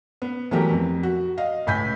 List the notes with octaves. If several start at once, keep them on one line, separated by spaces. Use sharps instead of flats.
B3
E3 F#3 A3 B3 G4 A#4
F2
F#4
D#5 F5
C#2 A2 G#5 B5 G6 B6